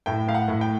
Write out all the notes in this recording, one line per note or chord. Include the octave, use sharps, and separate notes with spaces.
A2 G5
A2 F5
F#5
A2
G5